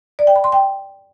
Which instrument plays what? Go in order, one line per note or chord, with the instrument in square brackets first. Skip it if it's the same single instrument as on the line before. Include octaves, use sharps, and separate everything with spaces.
[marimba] D5
G5
B5
C6
G5